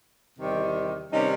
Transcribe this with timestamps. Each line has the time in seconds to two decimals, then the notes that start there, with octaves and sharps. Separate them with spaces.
0.36 E2 C3 D#3 G3
1.11 C3 D#3 G3 C#4 D#4